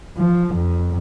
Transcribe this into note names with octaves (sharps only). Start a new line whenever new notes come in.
F3
F2